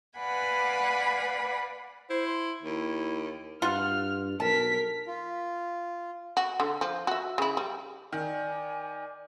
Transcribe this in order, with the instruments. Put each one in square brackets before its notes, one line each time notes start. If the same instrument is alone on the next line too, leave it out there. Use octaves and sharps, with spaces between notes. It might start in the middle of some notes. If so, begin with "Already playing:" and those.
[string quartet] B4 D5 F5 F#5 G#5 B5
[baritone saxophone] E4 [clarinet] C5
[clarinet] C6
[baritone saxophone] D#2 [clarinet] E4
[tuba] G2 [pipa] F4 F#5 [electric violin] F6
[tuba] B1 [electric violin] A#4 B6 [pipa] A5
[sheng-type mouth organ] F4
[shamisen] F#4
D3
F3
F#4 E5
C#3 E4
G3
[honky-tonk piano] D#3 [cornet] D5 [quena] G#5